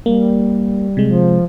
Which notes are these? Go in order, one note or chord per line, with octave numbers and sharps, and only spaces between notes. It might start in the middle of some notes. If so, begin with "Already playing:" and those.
G3 A#3
C3 G#3
F3